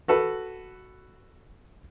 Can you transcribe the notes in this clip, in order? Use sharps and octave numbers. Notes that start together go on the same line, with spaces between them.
F#4 A4 B4